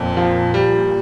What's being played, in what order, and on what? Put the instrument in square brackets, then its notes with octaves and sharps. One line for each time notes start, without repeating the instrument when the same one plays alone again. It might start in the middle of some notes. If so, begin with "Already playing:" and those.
Already playing: [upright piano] F2 [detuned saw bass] A#2
[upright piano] F3
G3